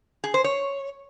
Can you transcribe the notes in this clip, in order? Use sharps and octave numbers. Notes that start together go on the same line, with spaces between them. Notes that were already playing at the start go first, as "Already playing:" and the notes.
G#4
C5
C#5